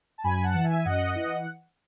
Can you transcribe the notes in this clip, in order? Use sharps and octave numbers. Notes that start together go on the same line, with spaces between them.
A5
F#2 G#5 B5
B5
F#5 A5
E3
E5 G#5
F#2 D#5 F#5
E3